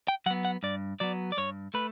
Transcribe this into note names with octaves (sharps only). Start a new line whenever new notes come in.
G5
F#3 B3 F#5
F#5
G2 D5
F#3 B3 D5
D5
G2 C#5
A3 B4